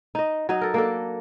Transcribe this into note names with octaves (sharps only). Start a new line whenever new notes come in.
D#4 D#5
F#3 D#4 D#5
A4 A#4
A#3 D4 A4